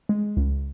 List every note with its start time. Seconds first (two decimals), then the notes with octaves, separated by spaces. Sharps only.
0.09 G#3
0.37 C#2